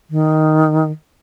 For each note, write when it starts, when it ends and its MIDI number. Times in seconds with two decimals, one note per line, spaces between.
0.10 0.91 51